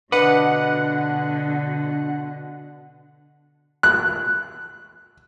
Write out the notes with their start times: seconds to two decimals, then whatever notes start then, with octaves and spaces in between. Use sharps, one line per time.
0.12 B2 D3 D4 B4 D#5 F#5 D6
3.83 F#6